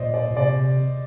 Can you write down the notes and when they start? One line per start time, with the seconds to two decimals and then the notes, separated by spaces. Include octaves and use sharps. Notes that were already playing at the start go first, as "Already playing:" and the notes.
Already playing: A#2 C5 D5 D#5
0.14 D5
0.31 A#2
0.37 C3 D5